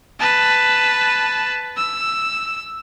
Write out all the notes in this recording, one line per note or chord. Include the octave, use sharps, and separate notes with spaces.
B4 A5
E6